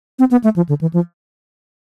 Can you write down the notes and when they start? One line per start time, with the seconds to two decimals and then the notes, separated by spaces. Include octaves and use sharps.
0.19 C4
0.31 B3
0.44 A3
0.56 F3
0.69 D3
0.81 E3
0.93 F3